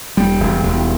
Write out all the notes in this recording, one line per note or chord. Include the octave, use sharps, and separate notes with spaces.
E1 G3
E1
E1